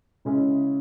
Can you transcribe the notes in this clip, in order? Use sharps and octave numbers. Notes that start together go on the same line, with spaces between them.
C#3 G#3 C#4 E4 G#4